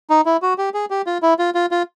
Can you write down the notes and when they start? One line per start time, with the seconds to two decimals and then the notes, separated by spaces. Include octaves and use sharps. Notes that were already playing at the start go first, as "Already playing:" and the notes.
0.10 D#4
0.26 E4
0.42 F#4
0.58 G4
0.74 G#4
0.90 G4
1.07 F4
1.22 E4
1.39 F4
1.55 F4
1.71 F4